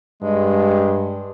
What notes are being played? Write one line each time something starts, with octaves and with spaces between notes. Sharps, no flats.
G2 G#3